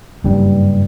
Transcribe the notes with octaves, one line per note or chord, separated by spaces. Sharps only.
F#1 G2 G3